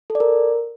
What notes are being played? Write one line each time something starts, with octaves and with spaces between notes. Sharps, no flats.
A4
D5
A#4